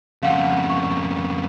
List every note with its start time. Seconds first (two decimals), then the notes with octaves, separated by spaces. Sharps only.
0.23 F2 C#3 F5 F#5
0.70 C#6